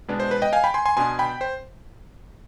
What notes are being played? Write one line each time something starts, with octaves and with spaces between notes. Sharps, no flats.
B2 G#3 B3 D4
C5
B4
D#5 G5
F5 G#5
G5 B5
G#5 C6
G#5 C6
B2 B3 D4 G#5 C6
G5 B5
C5